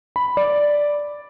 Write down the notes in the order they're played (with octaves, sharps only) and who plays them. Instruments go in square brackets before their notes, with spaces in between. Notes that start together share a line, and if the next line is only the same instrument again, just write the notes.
[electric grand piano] B5
D5